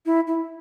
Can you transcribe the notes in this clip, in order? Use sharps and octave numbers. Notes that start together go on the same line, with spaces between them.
E4
E4